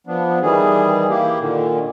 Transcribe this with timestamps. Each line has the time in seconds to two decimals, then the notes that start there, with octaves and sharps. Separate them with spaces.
0.07 F3 B3 D4
0.42 D#3 E3 G3 G#4
1.10 A#3 E4 G4
1.40 A#2 D3 D#3